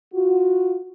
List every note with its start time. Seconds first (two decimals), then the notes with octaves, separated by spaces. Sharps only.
0.14 F4 F#4